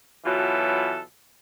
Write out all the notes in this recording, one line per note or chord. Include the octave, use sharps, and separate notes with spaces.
B2 E3 F#3 F4 A4